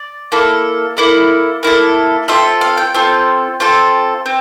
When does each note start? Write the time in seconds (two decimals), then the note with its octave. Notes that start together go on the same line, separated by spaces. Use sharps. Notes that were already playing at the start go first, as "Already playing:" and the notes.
Already playing: D5
0.32 A#3 E4 A4
0.97 A#3 E4 A4
1.63 A#3 E4 A4
2.28 C4 F4 A4 E5
2.61 F5
2.77 G5
2.94 C4 F4 A4
3.60 C4 F4 A4
4.26 C4